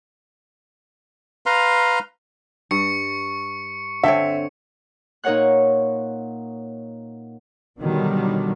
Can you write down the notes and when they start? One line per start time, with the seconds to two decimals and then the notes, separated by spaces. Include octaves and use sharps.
1.46 B4 F5 A#5 C6
2.71 G2 C#6 C#7
4.04 D3 C4 C#5 E5
5.24 A#2 D#4 A#4 C#5 F#5 F#6
7.79 B2 D3 D#3 F#3 G3